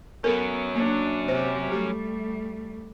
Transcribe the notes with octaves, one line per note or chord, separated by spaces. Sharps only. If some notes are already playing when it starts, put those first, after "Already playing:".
F#3 B3 C#4 A4 A#4
A#3 D4
C3 G4 C5
G3 A3 G4